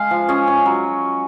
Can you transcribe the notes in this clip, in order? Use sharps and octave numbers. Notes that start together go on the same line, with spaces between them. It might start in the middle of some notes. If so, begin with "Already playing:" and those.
Already playing: G#3 F5
F3
C#4 D#5
C#4
F#3